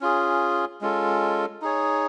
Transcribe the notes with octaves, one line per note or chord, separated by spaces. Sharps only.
C#4 F4 G#4
G#3 C#4 F4 A4
D#4 G#4 C#5